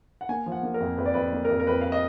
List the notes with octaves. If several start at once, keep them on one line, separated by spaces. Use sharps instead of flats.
F#5
A#3 G#5
F3
F#5
A#3
A#4
F2
F2 B4
D5
F2 B4
A#3
F2 A#4
A#4
F2 B4
F5
D#5